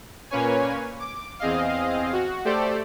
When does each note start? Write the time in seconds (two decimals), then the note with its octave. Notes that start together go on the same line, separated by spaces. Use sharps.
0.30 A#2 A#3 C#4 B4 C#5 G#5
0.99 D6
1.39 E2 C4 G#4 D#5 F5
2.13 F#4
2.45 A3 G4 A4 C5 D5